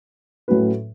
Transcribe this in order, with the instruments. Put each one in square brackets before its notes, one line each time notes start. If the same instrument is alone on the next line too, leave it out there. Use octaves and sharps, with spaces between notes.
[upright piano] A2 F#3 C#4 F#4 B4